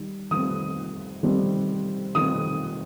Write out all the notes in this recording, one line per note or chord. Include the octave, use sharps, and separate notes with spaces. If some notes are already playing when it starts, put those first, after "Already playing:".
Already playing: D#3 G3
D#3 G3 C4 D#6
D#3 G3 C4
D#3 G3 C4 D#6